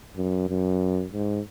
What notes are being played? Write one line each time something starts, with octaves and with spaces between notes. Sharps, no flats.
F#2
F#2
G#2